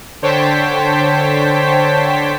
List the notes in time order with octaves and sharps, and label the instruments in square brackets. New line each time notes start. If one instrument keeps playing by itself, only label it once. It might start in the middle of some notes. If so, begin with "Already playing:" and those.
[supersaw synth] D3 C5 C#5 G5 A5 B6